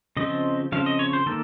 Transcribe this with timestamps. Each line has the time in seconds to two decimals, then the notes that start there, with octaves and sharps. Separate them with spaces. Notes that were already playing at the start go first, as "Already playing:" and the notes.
0.17 C#3 F3 C4 D#5
0.72 C#3 F3 C4 F5
0.86 D#5
0.99 C#5
1.13 C5
1.26 D#3 A#3 A4